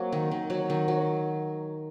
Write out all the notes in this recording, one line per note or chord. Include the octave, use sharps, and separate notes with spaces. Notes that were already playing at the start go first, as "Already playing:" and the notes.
Already playing: F#3 A#3 C4
D#3
D#3
F#3
D#3
F#3